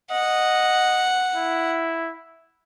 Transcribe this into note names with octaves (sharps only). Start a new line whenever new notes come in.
D#5 F#5
E4